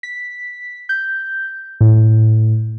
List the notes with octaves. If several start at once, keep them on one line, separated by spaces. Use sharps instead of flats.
B6
G6
A2